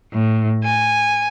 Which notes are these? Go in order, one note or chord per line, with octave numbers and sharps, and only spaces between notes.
A2
G#5